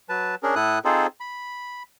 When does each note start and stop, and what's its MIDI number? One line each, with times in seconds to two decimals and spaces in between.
0.09 0.35 54
0.09 0.35 71
0.09 0.35 81
0.43 0.55 61
0.43 0.55 62
0.43 0.55 68
0.43 0.55 70
0.55 0.79 45
0.55 0.79 64
0.55 0.79 69
0.55 0.79 87
0.55 0.79 90
0.85 1.07 60
0.85 1.07 63
0.85 1.07 65
0.85 1.07 68
0.85 1.07 69
0.85 1.07 72
1.20 1.83 83